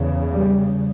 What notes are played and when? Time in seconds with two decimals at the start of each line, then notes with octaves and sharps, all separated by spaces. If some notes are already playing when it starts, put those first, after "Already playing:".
Already playing: E2 C#3
0.32 G3